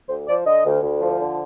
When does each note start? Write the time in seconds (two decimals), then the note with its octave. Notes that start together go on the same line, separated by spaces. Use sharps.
0.09 D2 C5
0.27 F3 D5
0.45 D3 D#5
0.65 D2
0.82 D2
1.00 F3
1.20 D3